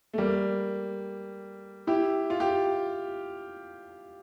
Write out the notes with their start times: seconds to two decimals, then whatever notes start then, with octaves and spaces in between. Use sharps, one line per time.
0.13 A3
0.18 G3 A#3
1.87 E4 G4
2.30 F4
2.40 G4